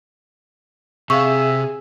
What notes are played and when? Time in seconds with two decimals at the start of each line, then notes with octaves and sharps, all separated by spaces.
1.10 C3 G#4 E5 F5 C#6